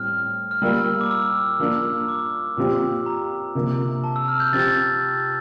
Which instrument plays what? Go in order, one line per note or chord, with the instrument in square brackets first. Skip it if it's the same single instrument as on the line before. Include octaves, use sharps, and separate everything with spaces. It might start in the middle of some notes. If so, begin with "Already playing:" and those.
Already playing: [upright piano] A2 G3 C4 [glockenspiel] F6
[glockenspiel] F6
[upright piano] G3 A#3 F4 [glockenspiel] E6
[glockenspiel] D6
E6
[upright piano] F3 A#3 D4
[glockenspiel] D6
[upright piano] A#2 F3 C4 G4
[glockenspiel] A#5
[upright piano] C3 F3 A#3 D4
[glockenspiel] A5
E6
F6
G6
[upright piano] F3 C4 G4 [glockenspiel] A6